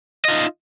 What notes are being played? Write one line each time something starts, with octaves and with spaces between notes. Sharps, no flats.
D#4 F4 D#5